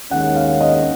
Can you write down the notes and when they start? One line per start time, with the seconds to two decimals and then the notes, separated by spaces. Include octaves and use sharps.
0.11 D#2 D#3 G#3 C#4 F#5
0.36 F5
0.61 D#5